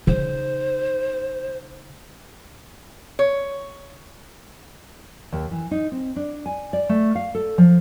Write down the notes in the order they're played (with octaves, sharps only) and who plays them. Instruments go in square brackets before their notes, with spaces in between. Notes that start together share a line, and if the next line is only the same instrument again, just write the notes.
[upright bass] C#3 D#4 [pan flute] C5
[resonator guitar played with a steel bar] C#5
[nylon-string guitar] D#2
E3
D#4
C4
D4
G#5
D5
A3
F5
A4
F3